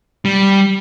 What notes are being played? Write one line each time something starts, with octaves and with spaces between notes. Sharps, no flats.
G3